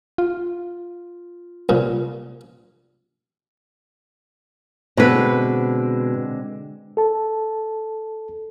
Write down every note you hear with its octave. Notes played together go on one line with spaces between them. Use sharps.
F4
C2 A#2
B2 D3 G#3 C4 B4
A4 A5